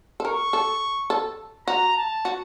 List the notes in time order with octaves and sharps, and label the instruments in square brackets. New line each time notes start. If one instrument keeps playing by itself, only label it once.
[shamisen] A4
[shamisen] A#4 [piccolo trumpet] C#6
[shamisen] A4
A4
[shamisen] F#4 [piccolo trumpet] A#5
[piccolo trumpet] A5
[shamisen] F#4